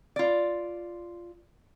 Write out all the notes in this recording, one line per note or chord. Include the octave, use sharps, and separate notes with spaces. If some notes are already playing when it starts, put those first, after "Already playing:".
F4 D5